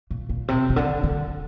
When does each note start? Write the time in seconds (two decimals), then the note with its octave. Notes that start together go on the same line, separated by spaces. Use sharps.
0.11 A#2
0.29 A#2
0.48 C3
0.70 C3
0.76 D3
1.03 D3